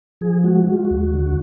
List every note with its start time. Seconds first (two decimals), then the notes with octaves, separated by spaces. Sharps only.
0.21 F3 G#4
0.44 G#3 F#4
0.67 G#3 F#4
0.76 F4
0.85 F#4
0.91 D#2
1.14 D3